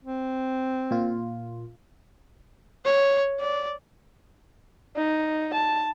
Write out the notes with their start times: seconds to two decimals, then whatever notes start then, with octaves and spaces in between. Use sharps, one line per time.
0.04 C4
0.91 A#2 F4
2.85 C#5
3.40 D5
4.97 D#4
5.55 A5